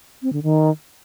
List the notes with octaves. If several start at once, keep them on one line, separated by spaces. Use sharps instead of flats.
C4
D3
D#3